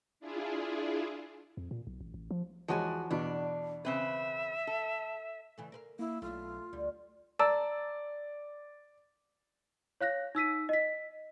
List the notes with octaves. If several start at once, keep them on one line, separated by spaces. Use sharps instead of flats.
D4 E4 F4 G#4
F2
A#2
B1
A1
A1
F3
E2 F3 G#3 F#4 C#5 G#5
E2 B2 D4
C#3 C4 B4 E5
A4
C#3 E3 A3
A#4 B4 F5
A#3 E4
B1 A3 F4 E5
D2 G3
D5 A5 A#5 E6
C#5 F5 F#6 A#6
D#4 E6 B6 D#7
D#5 B6